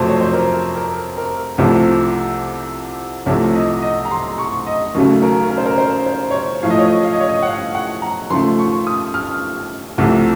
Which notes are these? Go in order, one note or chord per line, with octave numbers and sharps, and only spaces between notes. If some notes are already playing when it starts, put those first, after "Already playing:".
Already playing: F2 C3 F#3 A3 C5
C#5
C5
A#4
A#4
A#4
C2 C3 F3 A3 C5
C2 C3 F3 A3 C#5
D#5
D#5
A#5
C6
C#6
D#5
D#2 C#3 F#3 A3
A#4
A#4
C5
A#4
C5
C5
C#5
C5
A2 F3 A3 F5
D#5
C#5
D#5
F5
D#5
C#5
D#5
F#5
F5
F#5
A#5
D#2 C#3 F3 A3 C6
C#6
D#6
F6
C2 C3 F3 A3